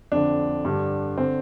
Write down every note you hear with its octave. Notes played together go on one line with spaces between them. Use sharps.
F2 D3 D4
G2 D3
D3 C4